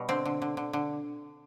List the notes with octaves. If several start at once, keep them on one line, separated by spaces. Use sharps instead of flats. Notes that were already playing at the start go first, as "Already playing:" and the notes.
Already playing: B2 G3
D3 C4
D3
D3
D3
D3